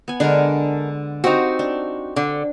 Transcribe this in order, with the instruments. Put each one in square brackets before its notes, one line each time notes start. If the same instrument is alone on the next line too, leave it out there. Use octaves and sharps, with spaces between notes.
[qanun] B3 G#5
[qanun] D3 G#3 [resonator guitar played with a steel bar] D4 A#4
[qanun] C4 G4 F5 [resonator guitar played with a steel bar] D#4 F#4
[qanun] D4
[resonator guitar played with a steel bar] D3